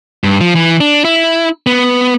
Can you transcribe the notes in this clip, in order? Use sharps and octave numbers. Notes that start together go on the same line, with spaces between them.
G2
F3
E3
D4
E4
B3